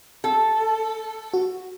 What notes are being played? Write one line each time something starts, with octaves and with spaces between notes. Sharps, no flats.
A4
F#4